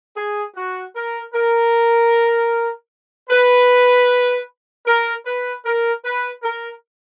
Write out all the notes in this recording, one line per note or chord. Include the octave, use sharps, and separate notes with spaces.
G#4
F#4
A#4
A#4
B4
A#4
B4
A#4
B4
A#4